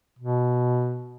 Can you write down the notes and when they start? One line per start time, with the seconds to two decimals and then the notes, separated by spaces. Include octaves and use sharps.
0.19 B2